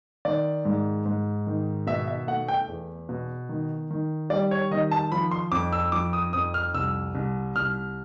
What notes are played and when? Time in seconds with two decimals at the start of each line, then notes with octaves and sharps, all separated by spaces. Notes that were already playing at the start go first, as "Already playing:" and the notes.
0.25 D#3 D5
0.65 G#2
1.06 G#2
1.47 D#3
1.87 B2 E5
2.08 E5
2.27 A3 F#5
2.48 G5
2.68 E2
3.09 B2
3.49 D#3
3.90 D#3
4.30 G3 D5
4.51 C#5
4.71 D#3 D#5
4.91 A5
5.12 F3 B5
5.31 C6
5.52 F2 D6
5.73 E6
5.92 F3 D6
6.13 D#6
6.33 F2 D#6
6.54 F6
6.74 C2 E6
7.15 C2
7.56 C2 F6